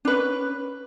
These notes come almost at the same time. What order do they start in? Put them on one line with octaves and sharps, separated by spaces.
D4 B4 C#4